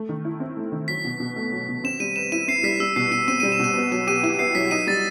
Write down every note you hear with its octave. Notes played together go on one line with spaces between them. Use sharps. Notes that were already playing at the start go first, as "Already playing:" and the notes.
Already playing: A3
D#3
E4
C4
A3
D#3
F#3 B6
B2
B2
A3
F#3
B2
C4 E7
G3 D#7
B4 E7
E4 D#7
C4 C7
G3 B6
G3 E6
B2 C7
B2 D#7
C4 D#7
D#7
G3
E7
B2 D#7
B3
F#3 D#7
G4 D#7
E4 D#7
B3 C7
F#3 B6
D#4 D#7
G3 A6